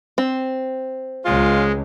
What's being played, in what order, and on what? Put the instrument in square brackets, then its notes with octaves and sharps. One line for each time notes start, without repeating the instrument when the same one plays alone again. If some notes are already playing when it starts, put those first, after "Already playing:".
[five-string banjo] C4
[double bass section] C#2 [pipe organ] G#3 [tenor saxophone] F4